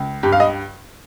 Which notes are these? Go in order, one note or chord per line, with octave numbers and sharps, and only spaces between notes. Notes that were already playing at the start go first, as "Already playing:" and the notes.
Already playing: C#2
G2 G4
F5
D#5